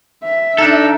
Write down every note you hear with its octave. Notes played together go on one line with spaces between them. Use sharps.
E5
D4 D#4 A4